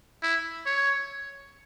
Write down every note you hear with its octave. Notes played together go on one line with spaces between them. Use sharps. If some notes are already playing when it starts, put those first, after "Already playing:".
E4
C#5